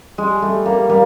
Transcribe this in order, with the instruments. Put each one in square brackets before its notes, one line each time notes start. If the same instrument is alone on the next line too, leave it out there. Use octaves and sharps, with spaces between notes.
[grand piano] G3 [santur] G#3
[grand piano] G3 [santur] A3
[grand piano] G3 [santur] A#3
[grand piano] G3 [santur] A#3